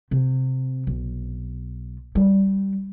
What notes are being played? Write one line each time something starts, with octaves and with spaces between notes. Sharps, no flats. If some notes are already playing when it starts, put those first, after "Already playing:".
C3
B1
G3